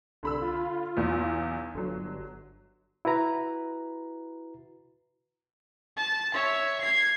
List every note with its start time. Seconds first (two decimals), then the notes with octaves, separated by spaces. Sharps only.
0.23 C2 D3 B5 E6
0.42 F4
0.97 B1 E2
1.74 G1 D3 F#3
3.05 E4 F#4 B4 A#5
5.97 A5
6.34 C#5 E5
6.81 G#6 C7